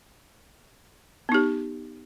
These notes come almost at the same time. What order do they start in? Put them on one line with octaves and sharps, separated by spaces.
B3 D#4 G4